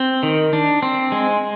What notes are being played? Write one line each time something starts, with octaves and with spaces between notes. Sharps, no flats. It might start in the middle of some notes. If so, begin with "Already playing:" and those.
Already playing: C4
D#3
D4
C4
G#3